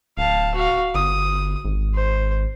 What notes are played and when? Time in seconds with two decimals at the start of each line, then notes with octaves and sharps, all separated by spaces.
0.18 D1 F5 A5
0.55 F#4 F5
0.95 G1 D#6
1.65 G#1
1.94 C5